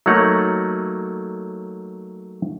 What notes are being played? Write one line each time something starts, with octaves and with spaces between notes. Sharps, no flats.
F#3 A3 A#3 D#4 C#5 F#5